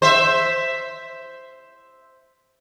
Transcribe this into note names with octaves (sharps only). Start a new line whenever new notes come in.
C5 E5